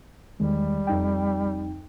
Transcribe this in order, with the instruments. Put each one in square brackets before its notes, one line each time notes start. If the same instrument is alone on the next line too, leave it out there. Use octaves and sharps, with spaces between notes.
[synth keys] E2 D#3 G#3 [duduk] G3
[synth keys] F2 D#4 G5